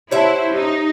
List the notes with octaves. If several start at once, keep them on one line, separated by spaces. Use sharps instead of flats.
E4 G4 C5 C#5 E5 F#5 A5
D#4 G4